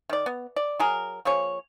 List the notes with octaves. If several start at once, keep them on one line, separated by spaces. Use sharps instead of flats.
D#3 D5
B3
D5
F#3 G#4 A#4
F3 A#3 G#4 C#5